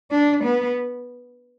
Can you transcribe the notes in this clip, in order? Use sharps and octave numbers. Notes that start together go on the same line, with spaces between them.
D4
B3